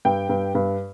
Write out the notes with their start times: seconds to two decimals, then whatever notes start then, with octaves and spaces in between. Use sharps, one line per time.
0.05 G2 G5
0.29 G2
0.55 G2